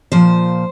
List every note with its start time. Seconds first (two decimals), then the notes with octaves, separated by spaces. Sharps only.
0.12 A#2 F3 C5